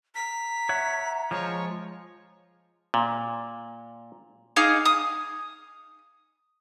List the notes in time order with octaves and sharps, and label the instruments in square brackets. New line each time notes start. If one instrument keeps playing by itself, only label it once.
[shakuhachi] A#5 [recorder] B6
[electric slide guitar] C#5 E5 F#5
[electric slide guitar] F3 G#3 [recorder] C#5
[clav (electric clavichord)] A#2
[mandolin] D#4 G#4 F5 D6
D#6